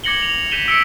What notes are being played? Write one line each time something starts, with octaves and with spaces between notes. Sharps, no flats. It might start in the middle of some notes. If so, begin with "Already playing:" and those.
D6 G#6 A#6 C#7 F#7 G7
F7
G6 B6 D#7 E7 G7
E6 B6 C#7 D7 G7